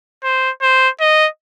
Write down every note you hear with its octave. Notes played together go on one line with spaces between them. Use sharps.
C5
C5
D#5